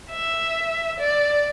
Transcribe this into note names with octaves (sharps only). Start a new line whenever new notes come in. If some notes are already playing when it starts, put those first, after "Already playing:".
E5
D5